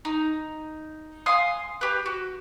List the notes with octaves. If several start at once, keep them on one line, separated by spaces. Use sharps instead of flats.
D#4
F5 G#5 C6 D#6
G4 B4
F#4